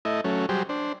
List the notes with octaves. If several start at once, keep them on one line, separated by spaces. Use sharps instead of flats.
A3 E4 D#5
F#3 A3 C#4
F#3 G3 G4 G#4 C5
D4 C5